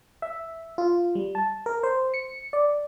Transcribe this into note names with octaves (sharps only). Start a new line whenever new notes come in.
E5
F4
G3
A5
A#4
C5
C#7
D5